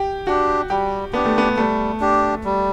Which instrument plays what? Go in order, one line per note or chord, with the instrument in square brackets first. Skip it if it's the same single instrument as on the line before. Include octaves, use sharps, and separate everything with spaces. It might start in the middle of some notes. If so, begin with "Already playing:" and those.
Already playing: [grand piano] G4
[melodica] D4 G4 [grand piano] F#4
[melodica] G3 [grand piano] G4
[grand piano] B3 [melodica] D4 G4
[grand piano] A3
B3
[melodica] G3 [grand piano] A3
[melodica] D4 G4
G3